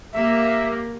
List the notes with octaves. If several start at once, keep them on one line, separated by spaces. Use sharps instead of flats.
A#3 G4 E5